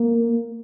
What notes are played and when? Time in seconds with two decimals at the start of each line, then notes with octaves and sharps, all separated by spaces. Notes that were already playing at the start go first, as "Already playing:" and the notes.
Already playing: A#3